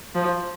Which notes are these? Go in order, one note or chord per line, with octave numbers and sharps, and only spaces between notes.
F3